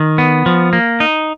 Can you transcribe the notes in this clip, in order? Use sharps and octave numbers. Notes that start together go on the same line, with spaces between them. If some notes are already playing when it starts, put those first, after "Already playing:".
Already playing: D#3
B3
F3
A#3
D#4